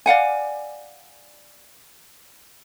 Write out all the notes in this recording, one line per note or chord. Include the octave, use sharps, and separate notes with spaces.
D5 F5 F#5 G#5